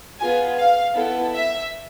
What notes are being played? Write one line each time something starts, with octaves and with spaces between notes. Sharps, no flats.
B3 F4 G#4 G#5
F5
B3 E4 A4
E5